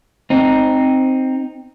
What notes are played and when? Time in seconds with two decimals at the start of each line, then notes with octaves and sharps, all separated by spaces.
0.30 C4 D#4